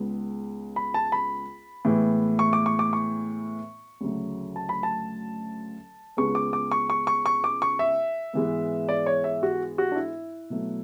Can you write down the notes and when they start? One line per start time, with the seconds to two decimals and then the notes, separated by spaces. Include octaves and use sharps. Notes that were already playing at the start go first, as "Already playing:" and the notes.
Already playing: C#2 C#3 G#3 B3
0.76 B5
0.94 A5
1.12 B5
1.85 A2 E3 G#3 B3
2.39 C#6
2.53 D6
2.66 C#6
2.79 D6
2.93 C#6
4.01 D2 C#3 F#3 A3
4.56 A5
4.69 B5
4.83 A5
6.17 C#2 C#3 G#3 B3 C#6
6.35 D6
6.53 D6
6.71 C#6
6.90 C#6
7.07 C#6
7.26 C#6
7.44 D6
7.62 C#6
7.79 E5
8.33 G#2 E3 G#3 B3
8.89 D5
9.06 C#5
9.24 E5
9.43 F#4
9.78 F#4
9.92 D4
9.96 E4
10.50 B2 F#3 A3